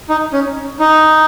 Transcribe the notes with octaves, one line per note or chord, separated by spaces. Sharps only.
D#4
C#4
D#4